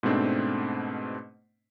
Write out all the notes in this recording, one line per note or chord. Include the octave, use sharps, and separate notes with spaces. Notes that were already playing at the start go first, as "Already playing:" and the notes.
G#2 B2 A3 C4 D4